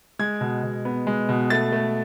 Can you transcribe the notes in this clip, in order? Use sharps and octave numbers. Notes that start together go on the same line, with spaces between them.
G#3 G#6
B2
B2
B3
G#3
B2
A3 A6
A3